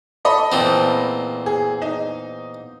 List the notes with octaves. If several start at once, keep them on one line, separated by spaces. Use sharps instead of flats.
A4 D#5 B5
E2 A#2 C4
G#4
D#4